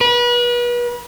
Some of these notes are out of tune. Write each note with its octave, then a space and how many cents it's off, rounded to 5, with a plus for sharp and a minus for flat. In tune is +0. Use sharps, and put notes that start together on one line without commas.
B4 -35